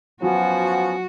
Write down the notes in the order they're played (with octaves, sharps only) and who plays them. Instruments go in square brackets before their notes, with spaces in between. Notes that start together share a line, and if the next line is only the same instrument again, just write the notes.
[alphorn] F3 [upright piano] F#3 [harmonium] B3 C#4 [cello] F#4